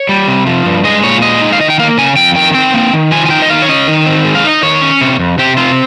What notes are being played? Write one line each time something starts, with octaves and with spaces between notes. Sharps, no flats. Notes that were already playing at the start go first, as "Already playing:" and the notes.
Already playing: C#5
G3
C3
F3
G2
G#3 D#5
A#2 C#5
G#3 D#5
D#4
F5
D#3 D#5
G5
A#3 F5
C#3 G#5
F2 G5
D#3 G5
C4 G5
A#3
D#3
F3 G#5
G#5
D#4 G5
D#5
D#3 F5
C#5
C#4 D#5
D#3
C4
G#3
F5
D#4 D#5
D#3 C#5
C#4
C3
F2
C3 G4
C4 F4